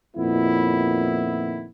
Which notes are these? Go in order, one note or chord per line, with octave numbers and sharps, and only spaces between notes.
F2 A#2 D#3 B3 E4